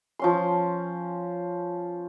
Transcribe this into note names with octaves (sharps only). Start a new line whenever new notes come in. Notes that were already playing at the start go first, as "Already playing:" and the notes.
F3 C#4 C6